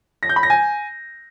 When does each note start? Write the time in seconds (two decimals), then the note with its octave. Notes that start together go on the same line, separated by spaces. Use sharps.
0.23 A#6
0.29 G6
0.36 B5
0.43 A#6
0.50 G#5